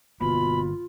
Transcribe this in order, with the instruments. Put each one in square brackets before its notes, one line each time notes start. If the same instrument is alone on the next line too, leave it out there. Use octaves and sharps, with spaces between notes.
[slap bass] G1 A#3 [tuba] B2 [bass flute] F4 [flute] B5